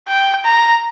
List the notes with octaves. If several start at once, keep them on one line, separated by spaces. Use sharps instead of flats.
G5
A#5